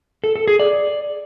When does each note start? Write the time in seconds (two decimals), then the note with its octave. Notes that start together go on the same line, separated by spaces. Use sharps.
0.24 A4
0.36 A4
0.48 G#4
0.60 D5